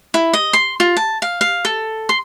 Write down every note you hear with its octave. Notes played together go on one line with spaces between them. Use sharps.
E4
D#5
C6
F4
A5
F5
F5
A4
C6